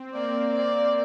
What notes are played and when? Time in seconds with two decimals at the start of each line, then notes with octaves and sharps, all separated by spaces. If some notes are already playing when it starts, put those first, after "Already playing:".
Already playing: C4
0.14 A#3 D5
0.53 D5